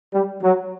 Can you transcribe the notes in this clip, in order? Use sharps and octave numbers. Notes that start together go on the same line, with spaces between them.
G3
F#3